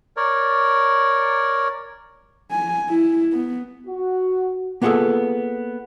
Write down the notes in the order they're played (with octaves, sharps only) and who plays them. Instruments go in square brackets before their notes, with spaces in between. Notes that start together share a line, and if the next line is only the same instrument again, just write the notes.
[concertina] A#4 C#5 D5
[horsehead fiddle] G#5
E4
B3
[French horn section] F#4
[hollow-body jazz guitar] A#3 B3 F4 F#4 G#4 A4